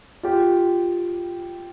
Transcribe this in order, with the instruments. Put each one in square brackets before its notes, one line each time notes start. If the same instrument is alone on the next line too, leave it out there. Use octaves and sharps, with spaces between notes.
[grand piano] F4 G4